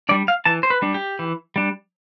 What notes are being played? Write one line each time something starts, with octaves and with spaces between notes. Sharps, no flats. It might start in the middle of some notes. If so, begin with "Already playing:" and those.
G3 D4 D5
F5
E3 A5
C5
B4
G3 D4
G4
E3
G3 D4